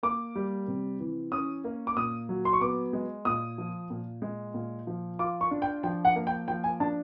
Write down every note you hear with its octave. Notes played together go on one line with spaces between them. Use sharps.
A#3 D6
G3
C3
E3
C#4 D#6
A#3
D6
A#2 D#6
F#3
C6
C#6
B3 D6
G#3
A#2 D#6
F3
A#2
G#3
A#2
F3
F4 D6
C#6
D4
G5
F3 G5
F#5
A#3
G5
F3 G5
G#5
D4 A5